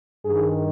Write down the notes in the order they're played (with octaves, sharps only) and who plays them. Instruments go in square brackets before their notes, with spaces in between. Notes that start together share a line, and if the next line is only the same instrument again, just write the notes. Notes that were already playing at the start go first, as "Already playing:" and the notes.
[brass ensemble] G2 D#3 G#4